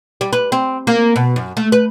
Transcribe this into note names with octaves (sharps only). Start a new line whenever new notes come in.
G3
B4
C4
A#3
B2
F#2
A3
B4